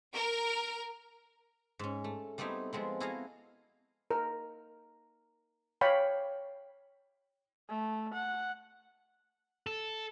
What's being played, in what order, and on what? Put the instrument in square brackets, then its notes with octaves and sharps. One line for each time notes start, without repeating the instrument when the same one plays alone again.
[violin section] A#4
[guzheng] G#2 C#4
A3
G3 A3 B3 C4 D#4 E4
F3 G#3 B3 C4
E4 F#4 G#4 A4 D#5 F5
[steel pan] A#4
C#5 F5 G5 B5
[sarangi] A3
F#5
[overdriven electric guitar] A4